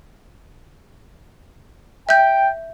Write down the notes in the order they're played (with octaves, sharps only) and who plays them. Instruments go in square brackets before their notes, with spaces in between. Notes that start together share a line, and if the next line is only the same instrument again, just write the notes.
[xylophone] E5 G6 [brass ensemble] G5